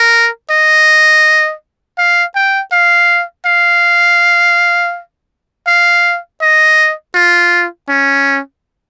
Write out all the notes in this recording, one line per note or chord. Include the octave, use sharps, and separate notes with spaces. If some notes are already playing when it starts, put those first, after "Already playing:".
Already playing: A#4
D#5
F5
G5
F5
F5
F5
D#5
F4
C#4